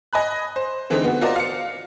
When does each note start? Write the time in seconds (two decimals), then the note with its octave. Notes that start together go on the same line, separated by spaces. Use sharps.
0.13 D#5 G#5 B5 F#6
0.56 C5
0.90 D3 E3 G#3 A3 C4 D#4
1.04 B3 F#4
1.21 F4 F#4 A#4 C5 D5 D#5
1.36 F5 C#7